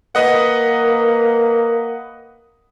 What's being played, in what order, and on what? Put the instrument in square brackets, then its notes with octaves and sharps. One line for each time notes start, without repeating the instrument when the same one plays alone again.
[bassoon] A#3 [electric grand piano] B4 D#5 F#5